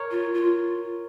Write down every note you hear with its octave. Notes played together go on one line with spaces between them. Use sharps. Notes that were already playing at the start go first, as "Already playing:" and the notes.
Already playing: A#4 C#5
F4
F4